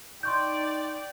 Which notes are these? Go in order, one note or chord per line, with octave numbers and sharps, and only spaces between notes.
D#4 D5 G5 C6 C#6 G6